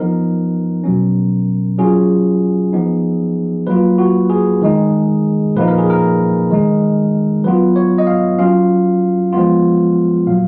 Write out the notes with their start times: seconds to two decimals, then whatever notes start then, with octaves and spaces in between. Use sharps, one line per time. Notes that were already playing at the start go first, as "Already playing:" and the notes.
Already playing: F3 B3 D#4 A#4
0.84 B2 F#3 C#4
1.78 F#3 C#4 F4 G#4
2.73 F3 B3 D#4
3.67 F#3 A#3 F4 B4
3.98 F#4
4.30 G#4
4.62 D#3 G#3 D#4
5.56 A#2 F3 A#3 D#4 B4
5.68 A#4
5.78 G#4
5.90 A#4
6.50 D#3 G#3 D#4
7.44 F#3 B3 F4 B4
7.76 C#5
7.98 D#5
8.07 F5
8.39 F#3 C#4 F4 F5
9.33 F3 G#3 B3 F4
10.27 A#2 F#3 F5